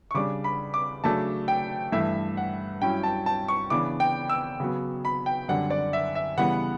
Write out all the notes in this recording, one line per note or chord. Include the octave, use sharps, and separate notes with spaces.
C#6
C#3 G3 D4 D6
B5
D6
C#3 F#3 A3 D4 A5
G5
G2 E3 A3 E5
F#5
G2 F#3 C#4 E4 G5
A5
A5
C#6
C#3 E3 B3 D4 D6
G5
E6
C#3 F#3 B3
B5
G5
F#2 D3 G3 D4 F#5
D5
E5
E5
C#3 E3 G3 B3 F#5